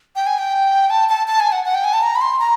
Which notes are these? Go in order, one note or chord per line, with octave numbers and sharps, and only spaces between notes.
G5
G#5
G5
A5
A5
A5
G#5
F#5
F#5
G5
G#5
A5
A#5
B5
C6
A#5